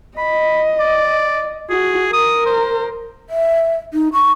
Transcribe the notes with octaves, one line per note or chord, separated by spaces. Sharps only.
D#5 B5
D5
F#4 G#4
A#4 D#6
C5
E5
D#4
C#6